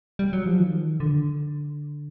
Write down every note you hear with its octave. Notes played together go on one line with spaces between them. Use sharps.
G3
F#3
F3
D#3
D3